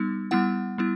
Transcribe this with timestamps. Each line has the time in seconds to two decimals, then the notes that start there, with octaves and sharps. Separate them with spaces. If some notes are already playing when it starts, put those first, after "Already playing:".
Already playing: G3 B3 D#4
0.31 G3 B3 E4 F#5
0.78 G3 B3 E4